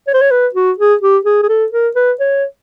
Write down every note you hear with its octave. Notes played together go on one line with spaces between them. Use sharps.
C#5
C5
C#5
B4
F#4
G#4
G4
G#4
G#4
A4
A#4
B4
C#5